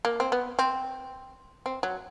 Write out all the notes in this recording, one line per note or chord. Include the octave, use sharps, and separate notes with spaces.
A#3
C4
B3
C4
C4
F#3